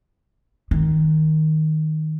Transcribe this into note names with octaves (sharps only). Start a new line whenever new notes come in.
D#3